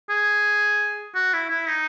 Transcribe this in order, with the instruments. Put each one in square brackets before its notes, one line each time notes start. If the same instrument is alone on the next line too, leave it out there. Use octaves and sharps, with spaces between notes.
[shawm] G#4
F#4
E4
E4
D#4